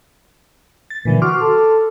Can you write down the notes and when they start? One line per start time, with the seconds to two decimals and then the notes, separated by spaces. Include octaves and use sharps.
0.90 A6
1.05 A#2 D3 E3 F#3
1.22 F#4 C6 D6 F6
1.41 A4